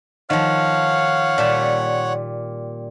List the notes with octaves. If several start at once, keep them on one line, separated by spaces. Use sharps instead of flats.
D#3 F3 C#5 F5 F#5
A#2 G3 A5